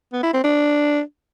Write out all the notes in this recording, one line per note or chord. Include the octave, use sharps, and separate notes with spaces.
B3
E4
C4
D4